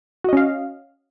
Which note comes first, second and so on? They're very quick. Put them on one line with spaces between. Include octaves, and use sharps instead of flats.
F#4 D#5 C#4 F5